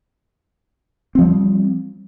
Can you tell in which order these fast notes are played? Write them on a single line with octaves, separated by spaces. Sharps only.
C4 F3 G3